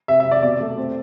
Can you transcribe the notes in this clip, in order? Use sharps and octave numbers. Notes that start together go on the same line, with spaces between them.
C3 E5
E5
C3
D5
B2 D5
A3
C4